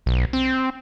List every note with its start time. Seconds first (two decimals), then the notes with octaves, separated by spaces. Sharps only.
0.06 B1
0.33 C4